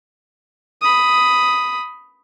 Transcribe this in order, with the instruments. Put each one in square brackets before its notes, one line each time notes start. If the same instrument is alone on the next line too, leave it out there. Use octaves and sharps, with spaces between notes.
[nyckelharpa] B5 D#6